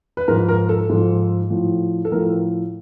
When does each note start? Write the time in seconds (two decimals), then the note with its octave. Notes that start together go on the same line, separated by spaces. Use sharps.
0.17 B4
0.28 G#2 F3 A#4
0.49 A#4
0.69 A4
0.89 G#2 F3
1.50 A2 F3
2.05 A4
2.12 A2 F3 A#4